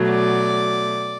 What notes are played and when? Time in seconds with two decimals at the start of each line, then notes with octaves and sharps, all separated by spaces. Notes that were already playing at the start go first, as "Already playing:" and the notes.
Already playing: B2 F#3 A3
0.08 D5